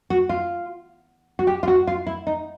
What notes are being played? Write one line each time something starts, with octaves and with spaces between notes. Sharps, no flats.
F#4
F4
F#4
G4
F4
F#4
F4
E4
D#4